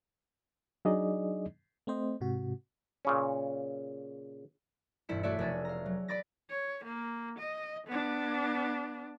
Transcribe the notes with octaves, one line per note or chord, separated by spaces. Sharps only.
F#3 D4 D#4 G#4 D5 D#5
A3 C4 C5 D#5
G#2 C3 F#4
A#2 C#3 C#4
E1 G2 E4 E5 C#7
A3 E4 F#4 C#5 D5 E5
F1 F#4 G#4 E6 A6
F5 A#5
F#3
D5 B5 D6 A6 A#6
C#5
A#3
D#5
B3 D4